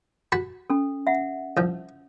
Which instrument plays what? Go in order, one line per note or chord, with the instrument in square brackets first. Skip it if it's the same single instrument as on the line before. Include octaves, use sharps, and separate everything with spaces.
[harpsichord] F#4 A5 B5
[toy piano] C#4 A4
E5 F#5
[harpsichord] C2 F3